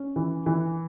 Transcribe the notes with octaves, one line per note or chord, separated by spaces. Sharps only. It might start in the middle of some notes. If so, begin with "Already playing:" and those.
Already playing: C#4
E3
E3